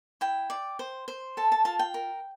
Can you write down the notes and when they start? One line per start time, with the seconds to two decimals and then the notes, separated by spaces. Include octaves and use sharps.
0.21 E4 G5
0.50 D5
0.79 C5
1.08 C5
1.37 A4 A5
1.52 A5
1.65 F4 A5
1.79 G5
1.94 A#4